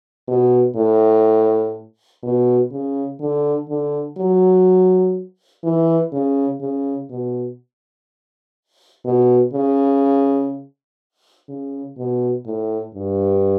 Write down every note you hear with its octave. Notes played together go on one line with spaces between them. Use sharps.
B2
A2
B2
C#3
D3
D3
F#3
E3
C#3
C#3
B2
B2
C#3
C#3
B2
A2
G2